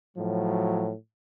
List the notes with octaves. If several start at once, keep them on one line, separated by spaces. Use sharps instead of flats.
A2 F3 F#3